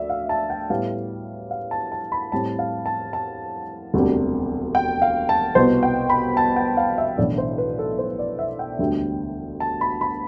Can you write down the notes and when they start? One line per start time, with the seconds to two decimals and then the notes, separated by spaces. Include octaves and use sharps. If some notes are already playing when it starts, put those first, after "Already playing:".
Already playing: D2 D5 E5
0.10 F5
0.29 A5
0.50 G5
0.70 A2 G3 B3 F5
1.51 F5
1.71 A5
1.92 A5
2.12 B5
2.32 A2 G3 C4 A5
2.59 F5
2.86 A5
3.13 A5
3.94 E1 D2 C3 G3 D4
4.75 G5
5.02 F5
5.29 A5
5.55 C2 B2 B3 C5
5.83 G5
6.10 B5
6.37 A5
6.56 G5
6.77 F5
6.98 E5
7.17 B1 A2 E3 A3 D4 D5
7.38 C5
7.58 B4
7.79 A4
7.99 C5
8.19 D5
8.39 E5
8.59 G5
8.79 E1 D2 D3 G3 D4
9.60 A5
9.81 B5
10.01 B5